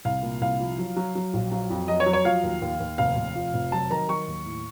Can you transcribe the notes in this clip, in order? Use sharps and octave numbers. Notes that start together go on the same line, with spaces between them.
C2 F5
A#2
C2 F5
F3
F#3
F#3
F#3
A#1
F#3
F2
F#3 D#5
C#5
F#3
C#5
F3 F5
D#2
D#2
D#2
F1 F5
F1
F3
F1
F#3 A5
D#3 A#5
F#3 C#6
D#2
A2